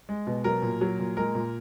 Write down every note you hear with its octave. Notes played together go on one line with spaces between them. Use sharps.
G#3
B2
F#3 A#4
A#2
F#3
A#2
G#3 A#4
A#2